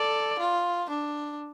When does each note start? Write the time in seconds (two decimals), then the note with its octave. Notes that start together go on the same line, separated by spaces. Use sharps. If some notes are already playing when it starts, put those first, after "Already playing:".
Already playing: A4 D5
0.38 F4
0.89 D4